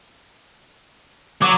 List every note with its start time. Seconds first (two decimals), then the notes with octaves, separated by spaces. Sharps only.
1.42 F#3 D6